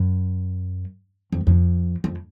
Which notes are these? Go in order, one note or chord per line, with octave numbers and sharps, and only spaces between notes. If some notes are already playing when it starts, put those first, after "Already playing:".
Already playing: F#2
F2
F2
F2